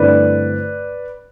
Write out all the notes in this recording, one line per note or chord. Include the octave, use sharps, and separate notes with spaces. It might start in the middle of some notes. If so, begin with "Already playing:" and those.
Already playing: G2 D3 A3 C4 E4 B4 D5